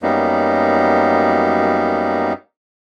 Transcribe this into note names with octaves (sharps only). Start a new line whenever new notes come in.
F#2 F#3 G3 A#3 B3 D#4